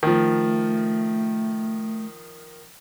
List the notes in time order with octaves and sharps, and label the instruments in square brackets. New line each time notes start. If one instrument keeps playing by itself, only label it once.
[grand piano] D#3 F3 [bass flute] A3